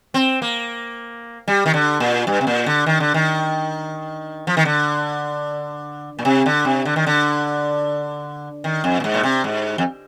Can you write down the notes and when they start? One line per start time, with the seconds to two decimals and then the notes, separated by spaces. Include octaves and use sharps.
0.14 C4
0.42 A#3
1.48 G3
1.66 D#3
1.74 D3
2.00 A#2
2.27 G2
2.41 C3
2.47 A#2
2.66 D3
2.86 D#3
3.00 D3
3.14 D#3
4.47 F3
4.57 D#3
4.65 D3
6.19 A#2
6.25 C3
6.46 D3
6.65 C3
6.85 D3
6.96 D#3
7.07 D3
8.64 D#3
8.84 F2
9.00 A#2
9.04 G#2
9.14 A#2
9.23 C3
9.44 G#2
9.78 F2